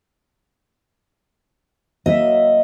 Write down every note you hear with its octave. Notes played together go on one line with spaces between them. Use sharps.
F#3 A#3 D#5 E5